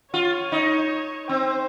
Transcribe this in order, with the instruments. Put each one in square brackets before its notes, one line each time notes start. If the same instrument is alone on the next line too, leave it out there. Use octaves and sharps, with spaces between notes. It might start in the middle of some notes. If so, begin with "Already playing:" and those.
[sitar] F4 [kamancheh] C#5
[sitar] D#4
[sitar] C4 [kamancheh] C5